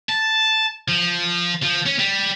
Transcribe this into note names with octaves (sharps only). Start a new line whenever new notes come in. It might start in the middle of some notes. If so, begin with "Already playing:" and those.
A5
F3
F3
C#4
G3